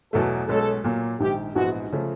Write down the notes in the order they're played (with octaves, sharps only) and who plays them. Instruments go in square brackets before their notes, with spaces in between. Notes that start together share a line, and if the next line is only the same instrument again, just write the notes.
[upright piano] E2 B2 F#3 A3 [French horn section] A4
[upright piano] B1 B2 G#3 C#4 [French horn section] A4
[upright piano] A#2 F#3 A#3
[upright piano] A#1 G#2 D#3 [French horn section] G4
[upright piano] A#1 G#2 E3 G#3 B3 [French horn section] F#4
[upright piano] C#3 F3 A3